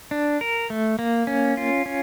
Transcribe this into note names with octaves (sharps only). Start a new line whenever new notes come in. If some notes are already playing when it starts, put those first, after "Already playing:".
D4
A#4
A3
A#3
C#4
F4
C#4